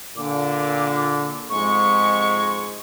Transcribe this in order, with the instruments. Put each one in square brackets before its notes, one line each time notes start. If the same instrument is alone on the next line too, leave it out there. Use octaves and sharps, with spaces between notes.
[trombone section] A#2 D3 [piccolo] D6
[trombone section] F2 G#2 G#3 [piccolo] C#6